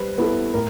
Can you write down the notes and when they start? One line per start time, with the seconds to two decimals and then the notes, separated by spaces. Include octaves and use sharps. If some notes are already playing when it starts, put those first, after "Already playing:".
Already playing: G3 B4 C5
0.18 B3 E4 A4
0.54 A2 A#4